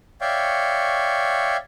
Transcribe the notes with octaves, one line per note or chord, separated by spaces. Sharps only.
C#5 D5 E5 F5 G5 C#6